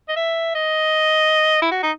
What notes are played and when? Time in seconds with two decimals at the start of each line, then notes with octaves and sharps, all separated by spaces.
0.09 D#5
0.17 E5
0.55 D#5
1.62 E4
1.72 F#4
1.83 D#4